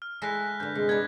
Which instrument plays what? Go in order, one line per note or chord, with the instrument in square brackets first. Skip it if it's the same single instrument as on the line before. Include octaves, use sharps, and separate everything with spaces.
[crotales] F6
[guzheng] G#3 E4 A4 [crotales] F#6 A#6 B6
[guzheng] G2 D3 [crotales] G6
[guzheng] C3 [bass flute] G#3
[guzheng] B3 D4 [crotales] G#6